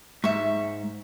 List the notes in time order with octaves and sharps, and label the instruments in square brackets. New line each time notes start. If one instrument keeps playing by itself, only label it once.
[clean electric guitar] G#2 [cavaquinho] E5 C#6